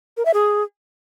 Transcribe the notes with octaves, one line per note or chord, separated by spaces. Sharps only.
A#4
E5
G#4